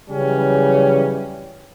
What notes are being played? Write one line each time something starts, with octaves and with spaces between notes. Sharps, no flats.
C#3 E3 F#3 G3 C#4